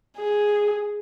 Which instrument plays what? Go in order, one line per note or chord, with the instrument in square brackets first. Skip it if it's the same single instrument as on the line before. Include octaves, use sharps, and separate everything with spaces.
[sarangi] G#4